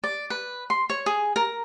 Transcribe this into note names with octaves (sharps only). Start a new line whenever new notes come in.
D5
B4
C6
C#5
G#4
A#4